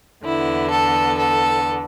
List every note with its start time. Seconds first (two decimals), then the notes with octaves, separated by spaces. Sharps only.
0.23 E2 D3 B3 E4
0.70 A4
1.18 A4